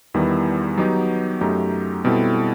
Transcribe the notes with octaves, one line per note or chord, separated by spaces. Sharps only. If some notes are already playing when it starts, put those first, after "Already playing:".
E2 D#3 G3 B3 E4
F#3 B3 D#4 G4
F#2 F#3 A3 D#4 G4
B2 G3 C4 E4 A4